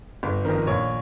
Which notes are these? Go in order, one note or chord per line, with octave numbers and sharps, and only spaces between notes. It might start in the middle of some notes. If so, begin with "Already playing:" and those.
G1
F2 D#3 A#4
A#1 C#5